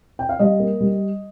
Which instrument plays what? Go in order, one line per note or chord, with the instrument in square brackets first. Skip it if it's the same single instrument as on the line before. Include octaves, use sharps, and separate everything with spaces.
[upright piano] G5
F5
G3 D#5
A#3
G3